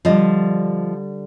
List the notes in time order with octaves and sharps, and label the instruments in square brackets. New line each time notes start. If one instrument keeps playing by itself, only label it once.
[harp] D3 G3 [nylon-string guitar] F3 D#5